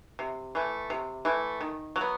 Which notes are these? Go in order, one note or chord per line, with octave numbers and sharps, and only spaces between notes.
C3
E3 A3
C3
E3 A3
D#3
F#3
B3